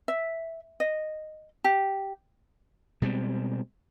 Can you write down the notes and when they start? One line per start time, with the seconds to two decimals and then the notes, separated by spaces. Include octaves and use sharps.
0.08 E5
0.80 D#5
1.64 G4
3.02 B2 G3 G#3 C4